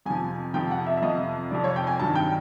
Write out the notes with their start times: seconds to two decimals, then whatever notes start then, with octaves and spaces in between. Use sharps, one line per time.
0.05 F2 C3 F3 G#5
0.54 F2 C3 F3 G5
0.71 F#5
0.86 E5
0.97 E5
1.02 F2 C3 F3 D#5
1.51 F2 C3 F3 D5
1.64 C#5
1.76 G5
1.87 G#5
1.99 G2 D#3 F#3 A5
2.16 G5